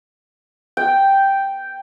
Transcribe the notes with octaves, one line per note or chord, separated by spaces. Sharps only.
G5